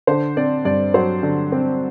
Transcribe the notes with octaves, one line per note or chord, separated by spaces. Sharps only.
D3 C5
C4 D5
G2 D5
F#3 C5
D3
C4